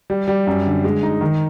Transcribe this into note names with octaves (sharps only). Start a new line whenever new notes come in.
G3
G3
F#2
D3
G#3
D#4
D#3